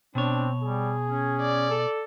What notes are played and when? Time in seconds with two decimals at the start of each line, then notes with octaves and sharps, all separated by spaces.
0.15 B2 C4 D4 C#5
0.63 G3 G#4
1.08 C#4
1.41 D5
1.70 A4